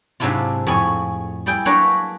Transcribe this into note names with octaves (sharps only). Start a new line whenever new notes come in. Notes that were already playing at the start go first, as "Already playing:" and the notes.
G#2 C3 F#3 D4 E4 F4
F2 A2 G#4 C#5 G#5 B5
G3 E4 G#4 G5
F#3 A#3 D4 B4 C#5 A#5